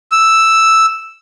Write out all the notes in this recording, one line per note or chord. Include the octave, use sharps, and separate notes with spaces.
E6